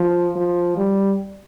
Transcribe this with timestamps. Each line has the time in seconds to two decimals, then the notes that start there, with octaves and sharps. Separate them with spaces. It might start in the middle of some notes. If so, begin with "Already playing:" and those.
Already playing: F3
0.36 F3
0.77 G3